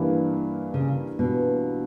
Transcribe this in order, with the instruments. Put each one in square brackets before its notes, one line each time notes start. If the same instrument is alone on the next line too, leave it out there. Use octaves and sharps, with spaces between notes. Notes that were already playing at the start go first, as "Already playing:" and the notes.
Already playing: [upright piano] G2 E3 A#3 E4 B4
[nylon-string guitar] C#3
B2